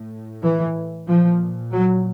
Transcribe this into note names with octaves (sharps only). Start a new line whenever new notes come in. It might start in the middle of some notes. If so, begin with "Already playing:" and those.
Already playing: A2
E3
A#2 F3
F#3